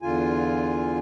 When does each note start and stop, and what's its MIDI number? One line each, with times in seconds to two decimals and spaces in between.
0.02 0.99 40
0.02 0.99 50
0.02 0.99 65
0.02 0.99 80